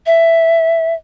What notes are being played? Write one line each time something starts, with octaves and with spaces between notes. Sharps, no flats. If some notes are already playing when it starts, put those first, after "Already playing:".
E5